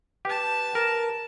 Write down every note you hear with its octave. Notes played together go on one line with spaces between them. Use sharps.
G4 B4 A5
A#4